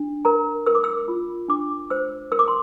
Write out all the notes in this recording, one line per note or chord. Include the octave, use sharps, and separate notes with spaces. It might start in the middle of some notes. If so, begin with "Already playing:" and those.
Already playing: D4
A#4 A#5
A#4 E6
D6
E6
F4
D4 D6
C5 E6
A#4 E6
D6
C6